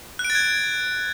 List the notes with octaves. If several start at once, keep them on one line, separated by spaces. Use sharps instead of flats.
F#6
D7
A6
G#6